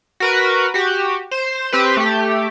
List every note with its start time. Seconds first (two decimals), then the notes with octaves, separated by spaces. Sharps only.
0.20 F#4 A#4 B4
0.74 F#4 G4
1.31 C5 E7
1.73 C4 G4 B4
1.97 A3 G4